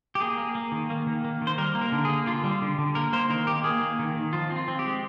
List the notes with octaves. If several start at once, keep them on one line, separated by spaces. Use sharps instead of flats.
G4
A#3 G#4
A#3
A#3
D#3
A#3
D#3
A#3
D#3
C5
G3 A#4
A#3
A#4
D3
A#3 G#4
D3 F4
G3
D3
D3
A#3 A#4
A#3 C5
D#3 A#4
A#3 G4
A#3 G#4
A#3
D#3
D#3
F3 F4
C4
F4
C4
G4
G#3